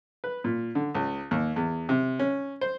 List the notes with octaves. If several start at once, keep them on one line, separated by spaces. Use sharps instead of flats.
B4
A#2
D3
C#2
D#2
E2
C3
C#4
C5